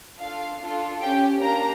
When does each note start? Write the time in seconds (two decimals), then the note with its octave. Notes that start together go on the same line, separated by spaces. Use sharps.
0.18 D4 F4 A4 F5
0.60 D4 F4 A4
1.01 C#4 G4 G5
1.42 A#3 D4 G4 A#5